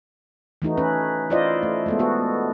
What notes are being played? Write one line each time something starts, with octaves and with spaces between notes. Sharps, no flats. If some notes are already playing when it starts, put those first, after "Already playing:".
E3 A3 D#4 F#4
C#4 B4
E4 F4 C5 D5 D#5
A3
G#3 A3 B3
B3 F#4 A4